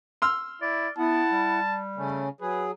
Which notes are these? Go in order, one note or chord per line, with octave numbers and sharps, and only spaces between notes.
C6 E6 F6
E4 D5
B3 E4 F#5 A5
G3
C#3 A3 C#4
F#3 G#4 B4